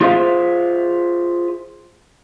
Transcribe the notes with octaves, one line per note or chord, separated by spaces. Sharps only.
F4 G#4 C5 E5 F5